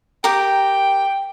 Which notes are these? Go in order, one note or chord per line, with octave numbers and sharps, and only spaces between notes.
G4 A#4 G5